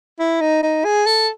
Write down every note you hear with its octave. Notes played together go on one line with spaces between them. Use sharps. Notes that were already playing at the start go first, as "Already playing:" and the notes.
E4
D#4
D#4
G#4
A4